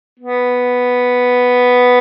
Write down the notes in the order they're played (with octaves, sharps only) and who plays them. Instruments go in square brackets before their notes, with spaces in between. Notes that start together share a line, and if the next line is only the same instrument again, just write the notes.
[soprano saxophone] B3